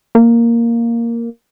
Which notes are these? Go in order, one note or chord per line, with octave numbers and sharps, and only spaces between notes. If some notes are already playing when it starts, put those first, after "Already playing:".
A#3